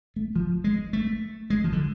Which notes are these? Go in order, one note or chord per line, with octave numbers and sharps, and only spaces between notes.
A3
F3
G#3
A3
G#3
F3
D3